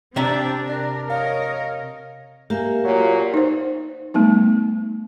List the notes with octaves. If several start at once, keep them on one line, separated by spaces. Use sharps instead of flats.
C3 C4 D4 E5 A#5
D4 A#4
A#4 C#5 D#5 F5
A#3 G4 E5 G#5
A#2 F#3
D#4 C5
G3 A3 B3 D#4